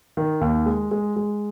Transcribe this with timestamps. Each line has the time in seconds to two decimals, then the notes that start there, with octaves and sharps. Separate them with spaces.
0.17 D#3
0.41 D#2
0.66 G#3
0.91 G#3
1.16 G#3